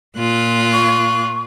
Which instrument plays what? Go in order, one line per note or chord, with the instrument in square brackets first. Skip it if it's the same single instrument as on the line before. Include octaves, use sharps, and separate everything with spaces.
[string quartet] A#2 F4 F#6
[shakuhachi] C#6